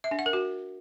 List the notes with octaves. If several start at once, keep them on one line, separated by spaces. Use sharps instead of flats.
E5
D4
F#5
A#4
F#4